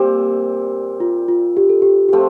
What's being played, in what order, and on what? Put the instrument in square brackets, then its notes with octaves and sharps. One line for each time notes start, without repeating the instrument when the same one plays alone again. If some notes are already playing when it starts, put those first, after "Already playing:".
Already playing: [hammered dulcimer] A#2 G3 C4 [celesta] G4
[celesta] F4
F4
G4
A4
G4
G4
[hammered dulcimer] C3 F3 A3 C4 [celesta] A4